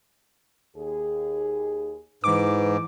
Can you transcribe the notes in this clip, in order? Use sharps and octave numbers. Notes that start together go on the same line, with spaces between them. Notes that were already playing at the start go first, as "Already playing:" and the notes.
D#2 G#4
G#2 E3 B4 D6